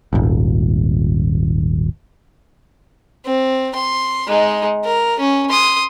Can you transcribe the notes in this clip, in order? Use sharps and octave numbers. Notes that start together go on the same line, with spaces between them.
D#1 G#1
C4
C6
G#3 D#4
A#4
C#4
C6 D#6